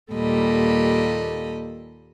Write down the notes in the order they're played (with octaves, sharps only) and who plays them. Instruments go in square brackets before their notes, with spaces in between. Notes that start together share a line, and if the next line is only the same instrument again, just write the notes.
[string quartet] D#2 A#2 G3 A4 D#5 B5